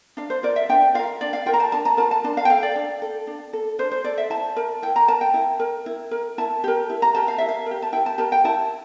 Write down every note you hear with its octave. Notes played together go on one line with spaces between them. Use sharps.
D4 F5
C5
F4 A#4 D5
E5
D4 G5
F4 A#4 F5
D4 D5
F5
F4 A#4 G5
A#5
A5
D4 A5
A#5
F4 A#4 A5
A5
D4 A5
F5
G5
A4 F5
D5
D4
A4
D4
A4
D4 C5
C5
A4 D5
E5
E4 A5
A#4
E4 G5
A#5
A#4 A5
G5
E4
A#4
E4
A#4
E4 A5
G4 A#4
E4
A#5
G4 A#4 A5
F5
E4 E5
F5
G4 A#4
A5
E4 G5
A5
G4 A#4 A5
G5
E4 A5